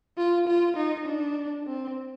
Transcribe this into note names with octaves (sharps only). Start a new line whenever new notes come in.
F4
F4
D#4
D4
C4